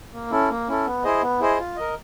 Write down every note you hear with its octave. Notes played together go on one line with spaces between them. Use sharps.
A#3
C#4 E4 A4
A#3
C#4 E4 A4
B3
E4 G#4 C5 D#5
B3
E4 G#4 C5 D#5
F4
A#4 D#5